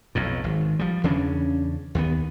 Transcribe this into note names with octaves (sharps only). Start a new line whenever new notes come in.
B1 F2 A2
G#1
F3 G3
E2 C#3 C#4 D4
D#2 B3